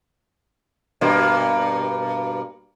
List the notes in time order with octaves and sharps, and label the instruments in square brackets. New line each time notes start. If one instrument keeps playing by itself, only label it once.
[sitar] G2 B2 A#3